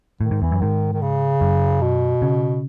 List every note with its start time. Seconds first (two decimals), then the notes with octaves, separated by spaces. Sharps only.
0.21 A2 D#3
0.31 G#2
0.41 E2 E3
0.52 F#2
0.61 G#2 D#3
0.93 D#3
1.02 C#3
1.41 F#2
1.82 B2
2.22 C#3